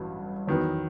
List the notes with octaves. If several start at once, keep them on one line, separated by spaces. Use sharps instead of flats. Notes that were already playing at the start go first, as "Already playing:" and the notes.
Already playing: A1 G2 F#3
E2 D#3 F#3 B3